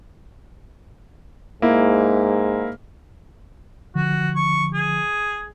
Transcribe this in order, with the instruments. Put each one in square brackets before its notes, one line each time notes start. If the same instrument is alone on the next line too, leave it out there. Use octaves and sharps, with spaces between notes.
[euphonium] G#2 [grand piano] A#3 E4
[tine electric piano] D3 F3 [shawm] F#4
[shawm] C#6
G#4